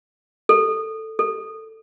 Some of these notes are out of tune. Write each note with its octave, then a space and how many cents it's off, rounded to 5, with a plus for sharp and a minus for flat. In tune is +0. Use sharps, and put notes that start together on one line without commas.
A4 +5
A4 +10